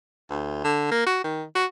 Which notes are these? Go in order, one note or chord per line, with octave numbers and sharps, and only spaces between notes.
D2
D3
A#3
F#4
D#3
F#4